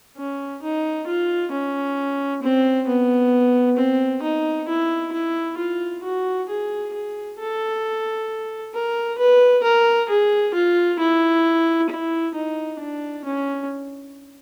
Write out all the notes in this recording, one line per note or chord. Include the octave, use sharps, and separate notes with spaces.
C#4
D#4
F4
C#4
C4
B3
C4
D#4
E4
E4
F4
F#4
G#4
G#4
A4
A#4
B4
A#4
G#4
F4
E4
E4
D#4
D4
C#4